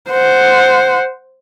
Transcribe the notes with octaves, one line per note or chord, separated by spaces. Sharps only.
C5 F#5